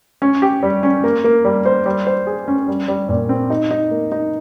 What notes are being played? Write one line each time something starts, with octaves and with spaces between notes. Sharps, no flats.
C#4
G4
G3
C#4
A#3
A#3
G3
C5
G3
C5
G#4
C#4
G3
G3
A#2
C4
D#4
D#4
A#3
D#4